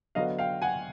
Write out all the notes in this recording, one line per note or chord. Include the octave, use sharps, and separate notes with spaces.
D3 F#3 B3 D#5 F5
F5 G5
F#5 G#5